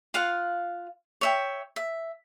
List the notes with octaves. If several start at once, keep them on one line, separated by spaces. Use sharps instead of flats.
F4 F5 F#5
C#5 E5 G5
E5